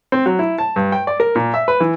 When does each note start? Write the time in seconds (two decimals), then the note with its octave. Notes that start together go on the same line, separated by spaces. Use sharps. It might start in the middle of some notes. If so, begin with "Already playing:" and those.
0.12 C4
0.26 F#3
0.39 E4
0.58 A5
0.76 G2
0.92 G5
1.07 D5
1.20 A#4
1.35 A#2
1.54 E5
1.68 B4
1.80 E3